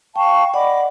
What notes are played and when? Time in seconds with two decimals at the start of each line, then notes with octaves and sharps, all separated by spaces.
0.16 F5 G5 A5 C#6
0.54 D5 D#5 F#5 B5 D6